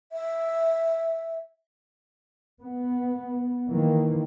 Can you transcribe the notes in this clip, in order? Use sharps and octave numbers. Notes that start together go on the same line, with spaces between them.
E5
B3
D#3 E3 A#3